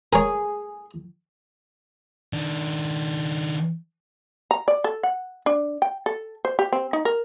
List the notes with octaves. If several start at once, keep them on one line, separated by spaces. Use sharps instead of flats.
G#4 A#4 C#5
D#3 D4
A#5
D5
A4
F#5
D4
G5
A4
C5
G4
C4
D#4
A#4